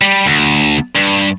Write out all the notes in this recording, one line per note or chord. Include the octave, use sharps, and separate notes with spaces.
G3
D2
G2